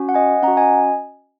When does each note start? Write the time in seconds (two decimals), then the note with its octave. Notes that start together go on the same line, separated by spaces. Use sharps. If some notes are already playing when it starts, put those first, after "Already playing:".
Already playing: C#4 F#4
0.09 F#5
0.14 D#5 G#5
0.43 C#4 F#5 A#5
0.48 F#4
0.57 D#5 G#5